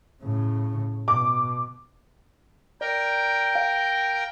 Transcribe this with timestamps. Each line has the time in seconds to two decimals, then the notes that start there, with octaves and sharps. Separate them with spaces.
0.23 A2 C#3
1.08 B2 D6
2.81 A#4 D5 G5
3.55 F5